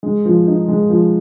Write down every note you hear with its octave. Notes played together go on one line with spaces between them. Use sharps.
G#3
F3
D#4
G#3
F3